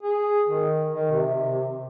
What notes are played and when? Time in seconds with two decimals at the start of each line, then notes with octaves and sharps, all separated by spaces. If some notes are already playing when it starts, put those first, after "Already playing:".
0.03 G#4
0.48 D#3
0.92 D#3
1.12 C3